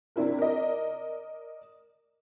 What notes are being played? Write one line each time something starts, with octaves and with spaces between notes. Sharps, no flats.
C3 D4 E4 A#4
A#4 D5 D#5